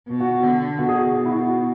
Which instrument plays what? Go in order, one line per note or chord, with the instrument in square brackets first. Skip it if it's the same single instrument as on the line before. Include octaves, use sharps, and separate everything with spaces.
[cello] B2
[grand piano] F#4
F#4
[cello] D3
[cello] B2 [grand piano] F#4
[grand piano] G#4
F#4
F#4
E4
F#4
F#4